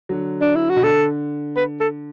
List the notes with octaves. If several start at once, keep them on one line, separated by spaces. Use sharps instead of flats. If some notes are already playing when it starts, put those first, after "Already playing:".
D3 F#3
D4
E4
F#4
B2
D3 A4
B4
A4